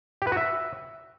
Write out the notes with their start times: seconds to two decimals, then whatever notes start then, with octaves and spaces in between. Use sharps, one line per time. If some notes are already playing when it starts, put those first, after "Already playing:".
0.22 G4
0.27 B4
0.32 F#4
0.37 E5